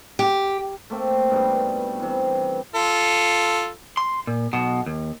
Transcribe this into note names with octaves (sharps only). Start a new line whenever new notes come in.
G4
A3 A#3 C4
G2 B2 G3 D#4
C3 E3
F4 A4
C6
A#2
B1 B2
D#2